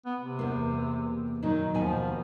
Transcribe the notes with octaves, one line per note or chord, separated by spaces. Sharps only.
B3
C3
E2 A#3
A#2 D#3 F#3 D#4
D#2 B2 F3 G#5